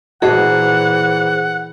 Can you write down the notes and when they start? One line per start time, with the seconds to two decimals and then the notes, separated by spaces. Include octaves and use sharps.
0.22 A#2 E3 F#4 G#4 C5 D#5 F#5 A5